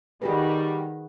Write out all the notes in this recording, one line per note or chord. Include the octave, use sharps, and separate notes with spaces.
D#3 G3 F#4 G#4 B4